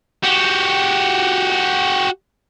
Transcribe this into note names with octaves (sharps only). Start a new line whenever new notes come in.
F#4 G4